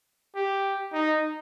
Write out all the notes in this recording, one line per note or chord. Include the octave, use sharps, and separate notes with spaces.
G4
D#4